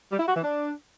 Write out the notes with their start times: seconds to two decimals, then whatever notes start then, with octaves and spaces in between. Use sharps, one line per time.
0.12 G3
0.19 E4
0.27 F#4
0.35 E3
0.43 D4